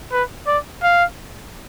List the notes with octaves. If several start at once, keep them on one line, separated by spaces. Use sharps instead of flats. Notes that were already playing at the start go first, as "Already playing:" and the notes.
B4
D5
F5